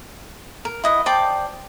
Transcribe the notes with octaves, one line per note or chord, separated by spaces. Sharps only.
A#4
E4 D#5 F#5
C5 D5 G5 A5